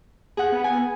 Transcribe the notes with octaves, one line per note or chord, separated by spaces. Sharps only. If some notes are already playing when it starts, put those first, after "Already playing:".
G#4 F#5
B3
G#5